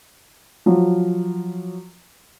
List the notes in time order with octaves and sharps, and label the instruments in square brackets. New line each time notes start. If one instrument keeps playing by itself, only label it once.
[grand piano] F3 F#3